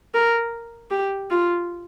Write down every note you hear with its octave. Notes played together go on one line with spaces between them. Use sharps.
A#4
G4
F4